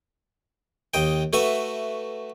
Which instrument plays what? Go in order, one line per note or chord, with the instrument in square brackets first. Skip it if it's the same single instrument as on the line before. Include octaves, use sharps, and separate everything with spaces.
[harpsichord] D#2 D#5 G5
A3 F#4 B4 E5